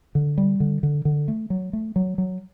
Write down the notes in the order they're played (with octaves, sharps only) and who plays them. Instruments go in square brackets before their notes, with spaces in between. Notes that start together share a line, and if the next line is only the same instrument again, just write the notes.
[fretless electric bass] D3
G3
D3
D3
D3
A3
F#3
A3
F#3
F#3